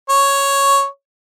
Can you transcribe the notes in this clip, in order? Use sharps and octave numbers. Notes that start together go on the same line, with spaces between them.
C#5